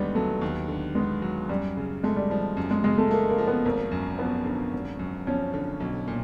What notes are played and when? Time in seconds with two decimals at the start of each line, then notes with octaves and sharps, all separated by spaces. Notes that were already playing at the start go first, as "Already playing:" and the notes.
Already playing: D#2 D3 G3 G#3 B3
0.15 F#3 A3
0.41 D#2
0.68 D3
0.95 G#3 B3
1.22 F#3
1.49 F#2 G3
1.77 C#3
2.04 G#3 A3
2.16 G3
2.30 F3 G3
2.57 F#2
2.71 G#3
2.84 C#3 G#3
2.98 A3
3.11 A3 A#3
3.29 A#3
3.38 F3
3.47 B3
3.65 G#1 A#3
3.91 F#2
4.19 F3 B3
4.45 D3
4.73 G#1
4.99 F#2
5.27 F3 C#4
5.54 D3
5.80 B1
6.07 A#2